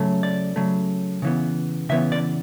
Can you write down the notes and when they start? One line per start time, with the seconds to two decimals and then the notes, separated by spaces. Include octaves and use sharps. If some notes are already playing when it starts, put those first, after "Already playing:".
Already playing: C#3 F#3 A3
0.23 D5
0.56 C#3 F#3 A3
1.22 C#3 E3 B3
1.89 C#3 E3 B3 E5
2.12 D5